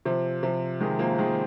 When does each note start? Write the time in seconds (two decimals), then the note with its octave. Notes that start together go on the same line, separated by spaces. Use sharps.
0.05 C3 F3
0.43 C3 F3
0.81 D#3 G#3
0.99 F3 A#3
1.18 D#3 G#3